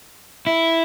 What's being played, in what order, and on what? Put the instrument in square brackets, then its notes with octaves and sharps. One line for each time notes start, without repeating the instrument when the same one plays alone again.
[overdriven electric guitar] E4